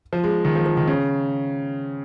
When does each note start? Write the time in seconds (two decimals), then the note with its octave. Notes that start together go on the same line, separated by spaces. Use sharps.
0.13 F3
0.24 G#3
0.45 D#3
0.55 F3
0.66 F3
0.77 D#3
0.88 C#3